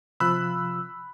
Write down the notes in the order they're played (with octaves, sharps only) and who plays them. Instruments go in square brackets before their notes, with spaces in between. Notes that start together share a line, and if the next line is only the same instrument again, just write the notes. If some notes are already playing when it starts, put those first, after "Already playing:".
[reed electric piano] C3 F3 F4 [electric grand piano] B5 F#6 [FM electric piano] E6